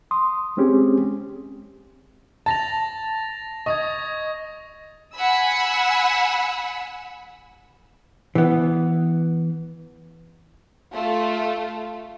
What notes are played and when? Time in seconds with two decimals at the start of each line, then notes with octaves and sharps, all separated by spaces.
0.11 C6 D#6
0.57 G#3 C4 C#4 G4 G#4
2.46 A5 A6 A#6 F7
3.66 D#5 C#6 D#6 G#6
5.15 F#5 G#5 B5 E6
8.35 E3 B3
10.92 A3 F4